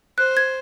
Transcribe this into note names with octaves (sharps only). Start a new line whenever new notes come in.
C5 F#6
G#6